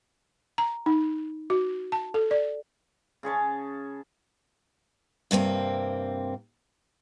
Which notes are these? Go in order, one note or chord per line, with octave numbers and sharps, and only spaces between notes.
A#5
D#4
F#4
A5
A4
D5
C#3 G#4 C#5 A5
G2 C3 A#3 C4